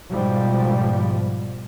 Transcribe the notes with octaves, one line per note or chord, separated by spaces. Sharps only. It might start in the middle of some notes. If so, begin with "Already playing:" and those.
G#2 B2 F3 G3